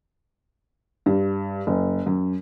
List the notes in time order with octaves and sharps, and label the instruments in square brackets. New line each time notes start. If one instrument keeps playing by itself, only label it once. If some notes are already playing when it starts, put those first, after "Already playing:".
[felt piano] G2
F#1
F#2